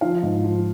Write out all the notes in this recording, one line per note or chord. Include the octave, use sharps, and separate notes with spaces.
F3 F5
G#2
F3